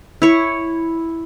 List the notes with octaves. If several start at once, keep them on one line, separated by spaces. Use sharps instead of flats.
E4 C#5